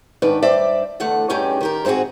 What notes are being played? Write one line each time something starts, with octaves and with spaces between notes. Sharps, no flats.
G#2 D#3 D4 B4 G5
G2 C5 D5 E5
E2 D3 A3 F#5
G2 A3 C#4 D#4 G4 G#4
D#3 G4 A#4
G#2 C4 D#4 F#4 G#4